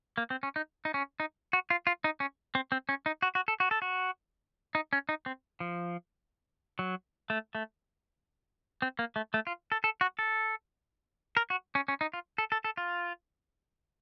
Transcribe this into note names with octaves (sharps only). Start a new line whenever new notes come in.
A#3
C4
C#4
D#4
D#4
C#4
D#4
F#4
F4
F4
D#4
C#4
C4
C4
C#4
D#4
F#4
F#4
A4
F#4
A4
F#4
D#4
C#4
D#4
C4
F3
F#3
A3
A3
C4
A#3
A3
A3
F4
A4
A4
F#4
A4
A#4
F#4
C#4
C#4
D#4
F4
A4
A4
A4
F4